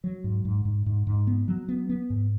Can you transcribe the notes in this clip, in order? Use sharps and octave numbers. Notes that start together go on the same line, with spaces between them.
F#3
G#2
G#2
G#2
G#2
G#2
B3
F#3
B3
B3
G#2